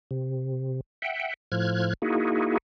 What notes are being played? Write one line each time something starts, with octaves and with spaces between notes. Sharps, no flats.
C3
E5 F#5 G5
A2 F3 F6 F#6 G#6
A#3 D#4 E4 F#4 G#4